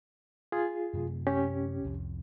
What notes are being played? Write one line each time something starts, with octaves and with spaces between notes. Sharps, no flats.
F4 G#4
F#2 C3 A3
C#4 G4
C2 F2